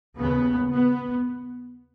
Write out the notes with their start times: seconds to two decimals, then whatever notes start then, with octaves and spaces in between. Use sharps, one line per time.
0.18 D#2 C#3 B3
0.73 B3